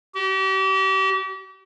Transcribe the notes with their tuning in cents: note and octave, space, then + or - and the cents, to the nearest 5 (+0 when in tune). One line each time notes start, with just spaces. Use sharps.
G4 -40